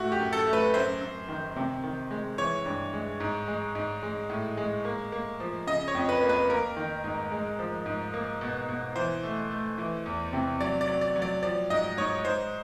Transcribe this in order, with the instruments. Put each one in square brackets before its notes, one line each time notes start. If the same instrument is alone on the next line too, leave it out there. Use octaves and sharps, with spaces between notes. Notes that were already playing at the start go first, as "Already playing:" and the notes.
Already playing: [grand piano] A2 A3 F#4
G4
F#2
A4
A3
B4
F#2 C5
F#2
D#3
C3
D#3
G#3
E3 C#5
G2
G#3
G#2
G#3
G#2
G#3
A2
G#3
A#3
A#3
F3
C#3 D#5
C#5
F2
B4
A#3
B4
A#3 A#4
D#3
G#2
G#3
F3
G#2
A#3
B2
B2
E3 C5
A3
A3
E3
E2
C3
F#3 D5
D5
F#3
D5
F#3
D5
F3 D5
G#2 D#5
G#2 C#5
G#2 C5